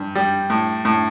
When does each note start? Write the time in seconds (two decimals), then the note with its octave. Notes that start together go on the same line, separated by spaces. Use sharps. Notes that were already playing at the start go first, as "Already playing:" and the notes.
Already playing: G2
0.15 G3
0.50 A2
0.85 A2